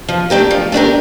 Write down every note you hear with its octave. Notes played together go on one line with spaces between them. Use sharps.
F3
A3 D4 G4 A#4
F3
A3 D4 G4 A#4